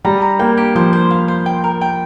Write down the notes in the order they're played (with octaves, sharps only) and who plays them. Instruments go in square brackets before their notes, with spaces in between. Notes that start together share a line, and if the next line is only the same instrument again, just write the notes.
[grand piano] G3 [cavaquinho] A#5
[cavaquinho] A#5
[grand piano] A#3 [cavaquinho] G5
[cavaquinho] G4
[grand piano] F3 [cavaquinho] C5
[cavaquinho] C5
F5
C5
G5
A#4
G5